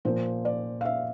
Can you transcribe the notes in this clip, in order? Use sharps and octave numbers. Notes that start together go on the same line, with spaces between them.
A#2 F3 A#3 C5
D5
F5
E5